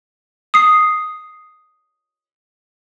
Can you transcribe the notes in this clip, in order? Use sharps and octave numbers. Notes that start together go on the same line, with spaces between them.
D#6 C7